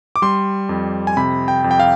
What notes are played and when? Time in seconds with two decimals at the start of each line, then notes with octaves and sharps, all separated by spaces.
0.16 D6
0.22 G3 C6
0.69 F2
1.07 G#5
1.17 C3 B5
1.48 G5
1.64 F2
1.71 G5
1.80 F5